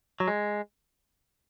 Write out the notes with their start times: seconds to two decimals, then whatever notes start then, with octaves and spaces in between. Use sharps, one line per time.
0.20 F#3
0.28 G#3